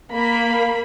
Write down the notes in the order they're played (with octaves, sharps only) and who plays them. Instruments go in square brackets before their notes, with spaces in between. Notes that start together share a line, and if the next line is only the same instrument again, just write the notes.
[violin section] A#3 B5